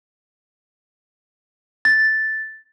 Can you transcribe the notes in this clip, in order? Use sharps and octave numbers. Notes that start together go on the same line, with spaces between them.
A6